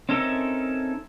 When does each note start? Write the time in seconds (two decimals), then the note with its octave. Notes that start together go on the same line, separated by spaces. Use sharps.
0.09 C4 C#4 D#4 A4 A#4 E5